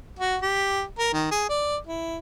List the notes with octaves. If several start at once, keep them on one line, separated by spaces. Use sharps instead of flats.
F#4
G4
A#4
D#3
G#4
D5
E4